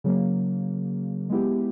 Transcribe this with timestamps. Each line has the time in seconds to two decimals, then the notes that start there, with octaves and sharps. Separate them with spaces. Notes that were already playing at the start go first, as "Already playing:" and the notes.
0.04 C#3 F#3 A#3
1.29 G#3 B3 E4 G4